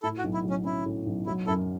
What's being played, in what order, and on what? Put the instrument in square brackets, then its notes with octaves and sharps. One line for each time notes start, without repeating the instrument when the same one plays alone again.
[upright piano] A2 [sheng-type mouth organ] E4 A4
[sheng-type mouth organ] F#4
[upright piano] B1
[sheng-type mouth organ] E4
[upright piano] F#3
[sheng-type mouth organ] C#4
[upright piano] C#4 [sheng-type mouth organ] E4
[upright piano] A2
B1
[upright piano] F#3 [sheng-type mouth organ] E4
[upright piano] F#2 [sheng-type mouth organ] E4 A4